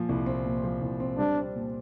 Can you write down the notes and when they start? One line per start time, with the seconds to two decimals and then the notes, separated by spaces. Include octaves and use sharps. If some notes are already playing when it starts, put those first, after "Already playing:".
Already playing: A#2 F3
0.09 C2
0.26 C4
0.45 A#2
0.64 F3
0.82 C2
1.00 C4
1.18 G3 D4
1.37 C4
1.56 A#2